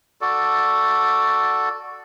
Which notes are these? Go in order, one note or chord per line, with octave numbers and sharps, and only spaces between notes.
F#4 A4 D5